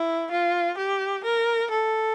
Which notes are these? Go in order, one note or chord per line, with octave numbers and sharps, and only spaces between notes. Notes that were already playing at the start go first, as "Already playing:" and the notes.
Already playing: E4
F4
G4
A#4
A4